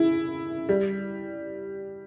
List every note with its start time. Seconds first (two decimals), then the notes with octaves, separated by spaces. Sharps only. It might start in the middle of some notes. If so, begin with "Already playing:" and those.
Already playing: E4
0.69 G3